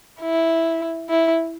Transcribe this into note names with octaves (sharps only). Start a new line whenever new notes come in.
E4
E4